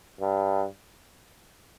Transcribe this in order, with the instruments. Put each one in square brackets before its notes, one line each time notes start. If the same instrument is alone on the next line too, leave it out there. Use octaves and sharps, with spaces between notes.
[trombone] G2